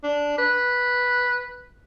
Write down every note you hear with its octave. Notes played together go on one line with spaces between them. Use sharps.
D4
B4